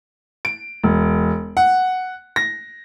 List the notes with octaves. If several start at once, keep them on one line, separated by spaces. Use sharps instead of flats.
D7
E1
F#5
A#6